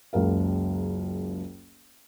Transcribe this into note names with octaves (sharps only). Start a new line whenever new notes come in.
F#1 C#2 A#4 F5